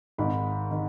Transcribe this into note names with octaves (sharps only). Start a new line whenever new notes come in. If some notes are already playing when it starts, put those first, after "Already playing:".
G#1 G#2 D#3 B5
D#3